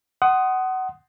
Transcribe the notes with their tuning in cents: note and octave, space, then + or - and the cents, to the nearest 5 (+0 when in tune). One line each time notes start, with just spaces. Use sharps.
F#5 +25 C6 +0 D#6 +0